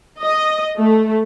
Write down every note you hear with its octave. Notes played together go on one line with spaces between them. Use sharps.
D#5
A3